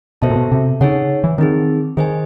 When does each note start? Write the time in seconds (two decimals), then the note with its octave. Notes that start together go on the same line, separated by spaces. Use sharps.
0.22 B2 F#4 A4 C5 E5 A5
0.30 A#2
0.36 B2
0.52 C3
0.81 C#3 D#4 G#4 C#5 F#5
1.24 E3
1.38 D#3 C4 D#4 G#4
1.97 D#3 G#4 C5 D#5 G#5